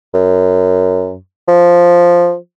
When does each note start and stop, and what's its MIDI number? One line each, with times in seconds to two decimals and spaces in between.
0.14 1.16 42
1.48 2.35 53